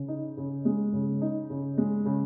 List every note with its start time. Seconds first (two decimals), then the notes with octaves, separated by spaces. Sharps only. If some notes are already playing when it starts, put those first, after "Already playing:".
Already playing: C#3
0.08 D#4
0.37 C#3
0.65 G#3
0.93 C#3
1.21 D#4
1.50 C#3
1.78 G#3
2.05 C#3